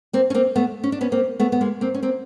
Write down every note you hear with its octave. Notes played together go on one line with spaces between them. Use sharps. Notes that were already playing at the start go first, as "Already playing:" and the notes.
A#3 C4
C#4
A#3 C4
A3 B3
C#4
D4
B3 C#4
A#3 C4
A3 B3
B3
G#3 A#3
A#3 C4
C#4
A#3 C4